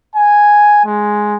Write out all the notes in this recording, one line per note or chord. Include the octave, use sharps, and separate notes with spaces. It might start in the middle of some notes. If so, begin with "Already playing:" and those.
G#5
G#3